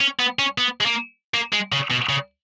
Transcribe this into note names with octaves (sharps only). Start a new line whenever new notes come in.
C#4
B3
C#4
B3
G#3
A#3
A#3
G#3
C#3
B2
C#3